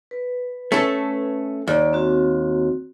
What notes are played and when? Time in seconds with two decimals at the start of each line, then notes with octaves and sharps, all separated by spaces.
0.11 B4
0.72 A3 C#4 A4
1.67 D#2 D5
1.93 C4 F#4